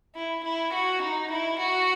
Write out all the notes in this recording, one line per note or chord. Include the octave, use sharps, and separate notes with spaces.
E4
E4
F#4
D#4
E4
F#4